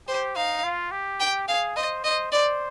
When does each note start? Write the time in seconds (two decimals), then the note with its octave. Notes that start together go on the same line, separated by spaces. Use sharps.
0.08 G4 C5
0.36 D#4 F5
0.64 F4
0.92 G4
1.20 G5
1.48 G#4 F5
1.76 C5 D#5
2.04 C5 D#5
2.32 C5 D5